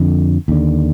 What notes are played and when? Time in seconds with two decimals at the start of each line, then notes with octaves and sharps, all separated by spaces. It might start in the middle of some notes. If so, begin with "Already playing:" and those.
Already playing: F2 D3
0.48 D#2 D3